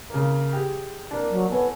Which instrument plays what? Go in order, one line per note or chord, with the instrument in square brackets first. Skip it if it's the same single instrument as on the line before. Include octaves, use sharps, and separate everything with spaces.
[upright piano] C#3 A#3
G4 G#4
A#3 D4
[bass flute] F#3
[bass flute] B3 [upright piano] A4 C#5 G#5